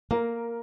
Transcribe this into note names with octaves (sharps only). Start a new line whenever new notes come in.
A#3 A#4